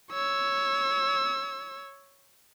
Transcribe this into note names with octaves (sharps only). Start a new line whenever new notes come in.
C#5 E6